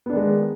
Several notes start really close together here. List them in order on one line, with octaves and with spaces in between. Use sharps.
B3 D4 D#3 G#3